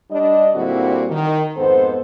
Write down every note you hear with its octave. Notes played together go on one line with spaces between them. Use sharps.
G3 D4 D#5
A#2 D3 G3 C4 E4 F#4
D#3
F2 G#2 B3 A4 C5